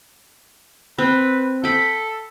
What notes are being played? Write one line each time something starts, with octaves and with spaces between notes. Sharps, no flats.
C4 B4
A4 G5 B5